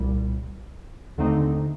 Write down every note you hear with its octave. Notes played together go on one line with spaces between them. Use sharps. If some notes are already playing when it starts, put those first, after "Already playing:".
Already playing: C2 A#2 G3
D#2 D3 A3 C4 D#4